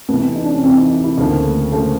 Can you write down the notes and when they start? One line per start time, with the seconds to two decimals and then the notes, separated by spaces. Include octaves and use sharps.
0.08 F2 C3 E3 B3
0.35 D#4
0.44 D4
0.54 C#4
0.63 F2 C3 E3 C4
0.77 D#4
0.90 D#4
1.04 E4
1.17 D2 C#3 F3 A#3 D#4
1.44 A3
1.72 C#3 F3 A3 A#3